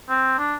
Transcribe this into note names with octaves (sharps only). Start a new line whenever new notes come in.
C4
D4